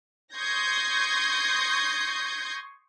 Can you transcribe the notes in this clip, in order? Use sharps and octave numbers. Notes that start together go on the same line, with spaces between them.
C6 C#6 D#6 G6 G#6 A#6